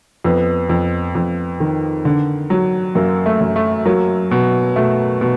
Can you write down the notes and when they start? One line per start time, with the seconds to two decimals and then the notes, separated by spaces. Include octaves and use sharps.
0.24 F2 B3
0.69 F2
1.15 F2
1.60 D#3
2.05 D3
2.50 F#3
2.95 F#2 A#3
3.26 A3
3.41 F#2
3.56 A3
3.86 F#3 A#3
4.31 B2
4.76 B2 A3
5.21 B2